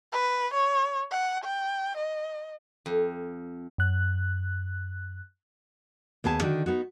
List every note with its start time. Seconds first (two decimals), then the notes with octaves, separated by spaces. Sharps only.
0.12 B4
0.53 C#5
1.11 F#5
1.44 G5
1.97 D#5
2.86 F2
3.78 F#2 F#6
6.24 D#2 B3 G#4 A5
6.40 D3 D#3 F#4
6.66 B3 D#4 F#4